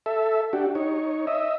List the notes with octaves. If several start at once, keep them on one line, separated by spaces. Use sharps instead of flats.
A4 E5
D4 F#4 G4
D#4 C#5
D#5 E5